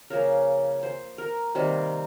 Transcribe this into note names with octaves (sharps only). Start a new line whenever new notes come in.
C#3 F3 A#3 A#4
C5
A#4
C3 D#3 G3 A#3 C5